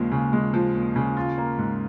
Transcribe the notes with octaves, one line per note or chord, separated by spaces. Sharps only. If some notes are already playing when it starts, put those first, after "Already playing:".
Already playing: D#2 C#3 F3 G#3
C#3
G#3
F3
D#2
C#3
F4
A#3
G#2